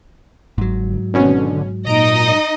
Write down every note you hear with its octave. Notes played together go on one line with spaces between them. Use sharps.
G1 G#2 F#3
G#1 B2 D3 C#4
A#2 D#4 D#5 A#5 D7